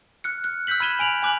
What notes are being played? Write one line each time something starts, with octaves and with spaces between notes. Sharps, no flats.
F6 F#6 C#7
F#6
E6 F#6 G6 B6 F#7
B5 F6 G#6 D#7 E7 G7
G#5 D7 F7 F#7
G#5 D6 F#6 F#7